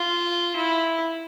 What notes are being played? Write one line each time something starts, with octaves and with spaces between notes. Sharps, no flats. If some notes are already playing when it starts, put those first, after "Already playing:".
Already playing: F4
E4